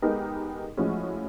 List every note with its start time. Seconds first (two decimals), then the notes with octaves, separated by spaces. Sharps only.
0.02 G#3 B3 D#4 G4 A#4
0.77 A2 F3 G#3 C#4 F#4